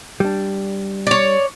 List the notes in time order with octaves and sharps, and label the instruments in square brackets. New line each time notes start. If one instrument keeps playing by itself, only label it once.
[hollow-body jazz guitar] G3 D4
[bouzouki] C#5 D5